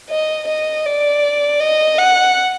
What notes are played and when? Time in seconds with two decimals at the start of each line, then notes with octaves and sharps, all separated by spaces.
0.10 D#5
0.48 D#5
0.85 D5
1.61 D#5
1.99 F#5